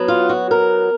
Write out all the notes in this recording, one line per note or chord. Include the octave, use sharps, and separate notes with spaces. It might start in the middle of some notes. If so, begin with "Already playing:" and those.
Already playing: F#3 B3
F4
F#4
A#4